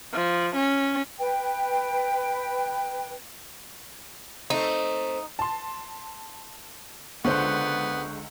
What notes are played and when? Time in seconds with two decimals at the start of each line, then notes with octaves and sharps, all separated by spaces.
0.13 F3
0.55 C#4
1.19 B4 G5
4.50 A3 C4 D#4
5.39 A5 C6
7.25 C#2 D3 B3 C5 C#6 F#6 G6